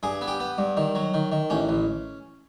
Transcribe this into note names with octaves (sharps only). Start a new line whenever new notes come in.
G2 G#4
B3
G4
B3
G2
D#3
F#3
D#3
D#3
A1 C#4
A1